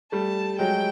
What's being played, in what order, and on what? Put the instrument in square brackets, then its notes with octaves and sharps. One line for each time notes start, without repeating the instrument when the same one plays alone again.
[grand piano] G3 A3 [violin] A5
[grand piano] F#3 G#3 [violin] G5